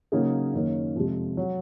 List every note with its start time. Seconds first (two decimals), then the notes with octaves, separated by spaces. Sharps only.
0.12 C#3 F#3 A#3 D#4 G#4
0.53 F#2 D#3 A#3 C#4
0.95 F2 C3 F3 G#3
1.37 F#3